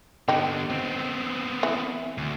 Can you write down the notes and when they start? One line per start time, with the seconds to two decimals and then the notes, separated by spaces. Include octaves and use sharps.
0.28 D3 B3 D#4 G4
0.70 B3 C4
1.63 E3
2.18 D2